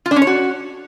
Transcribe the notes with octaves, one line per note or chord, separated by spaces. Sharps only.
F4
D4
C#4
C#5
F#4